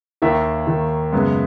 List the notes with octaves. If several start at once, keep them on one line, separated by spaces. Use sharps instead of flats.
D#2 D#3 A#3 E5
D#2 D#3 A#3
F#2 C#3 G#3 B3